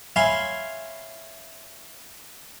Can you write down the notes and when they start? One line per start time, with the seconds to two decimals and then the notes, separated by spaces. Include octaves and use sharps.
0.16 C#5 E5 F5 G#5 B5 C6